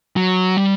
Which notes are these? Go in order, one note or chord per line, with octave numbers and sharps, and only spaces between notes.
F#3
G3